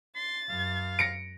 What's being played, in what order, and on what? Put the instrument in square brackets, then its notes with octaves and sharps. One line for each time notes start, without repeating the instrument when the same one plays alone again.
[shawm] C6 [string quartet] A6
[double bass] F#2 [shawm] F5
[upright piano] A#6 C#7 D7